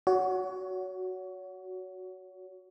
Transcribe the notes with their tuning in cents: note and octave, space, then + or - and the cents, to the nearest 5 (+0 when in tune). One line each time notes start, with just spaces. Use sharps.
F#4 +0 C#5 +30